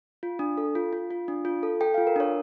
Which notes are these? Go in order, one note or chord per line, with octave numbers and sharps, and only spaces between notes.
F4
D4
A4
F4
F4
F4
D4
F4
A4
A4 G5
F4 F5
A#4
D4 C#5